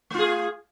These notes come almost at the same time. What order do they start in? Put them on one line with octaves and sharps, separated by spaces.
A3 F4 G#4